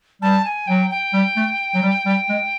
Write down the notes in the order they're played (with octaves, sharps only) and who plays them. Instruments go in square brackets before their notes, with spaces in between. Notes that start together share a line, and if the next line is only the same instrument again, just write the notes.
[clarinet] G3 [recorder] A5
[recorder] G#5
[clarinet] F#3 [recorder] G5
[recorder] G5
[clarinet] G3
A3
F#3
G3
G3
G#3